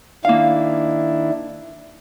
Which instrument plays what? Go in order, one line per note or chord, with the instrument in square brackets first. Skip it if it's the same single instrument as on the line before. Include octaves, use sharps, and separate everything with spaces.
[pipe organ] D#3 D4 E4 [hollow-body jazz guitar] A#3 F5